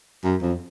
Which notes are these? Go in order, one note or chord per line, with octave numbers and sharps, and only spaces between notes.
F#2
F2